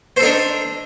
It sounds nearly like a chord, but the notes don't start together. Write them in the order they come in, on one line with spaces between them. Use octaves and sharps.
C5 A4 D#4 D4